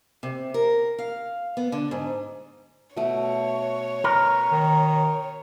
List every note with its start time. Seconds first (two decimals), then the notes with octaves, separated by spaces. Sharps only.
0.23 C3
0.54 A#4
0.98 F5
1.57 B3
1.72 D3
1.91 G#2
2.97 B2 A3 C#5
4.04 A#4 B4
4.52 D#3